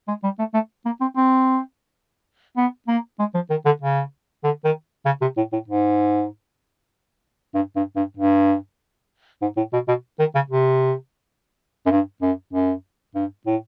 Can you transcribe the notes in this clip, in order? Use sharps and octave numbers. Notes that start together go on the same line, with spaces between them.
G#3
G3
A3
A3
A#3
C4
C4
B3
A#3
G#3
F3
D#3
D3
C#3
D3
D#3
C#3
C3
A2
A2
G#2
G2
G2
G2
G2
G#2
A2
B2
B2
D#3
C#3
C3
F#2
G2
F#2
F#2
G2
A2